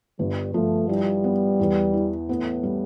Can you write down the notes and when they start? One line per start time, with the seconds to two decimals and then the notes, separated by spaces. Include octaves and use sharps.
0.19 G1 G3
0.54 F3 A3
0.89 G3 E4
1.24 B3
1.60 E2
1.94 E3
2.29 A2 B3
2.63 G3